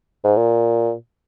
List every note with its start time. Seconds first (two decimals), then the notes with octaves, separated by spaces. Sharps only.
0.24 G#2
0.36 A#2